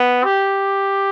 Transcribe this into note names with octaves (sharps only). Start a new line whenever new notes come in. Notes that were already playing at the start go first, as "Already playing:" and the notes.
Already playing: B3
G4